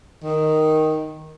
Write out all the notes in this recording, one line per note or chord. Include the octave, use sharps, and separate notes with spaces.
D#3